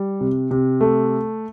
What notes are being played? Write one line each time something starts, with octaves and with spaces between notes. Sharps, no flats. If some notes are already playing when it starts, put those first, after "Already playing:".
Already playing: G3
C3
C3
A3